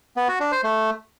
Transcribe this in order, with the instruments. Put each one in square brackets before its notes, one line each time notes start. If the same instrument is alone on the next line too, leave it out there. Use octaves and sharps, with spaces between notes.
[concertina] B3
F#4
D4
C5
A3